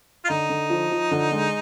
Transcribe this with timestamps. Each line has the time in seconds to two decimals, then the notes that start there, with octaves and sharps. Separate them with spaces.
0.25 F4
0.29 D3 D#4
0.49 D3
0.70 F3
0.91 F3
1.11 D3
1.32 G#3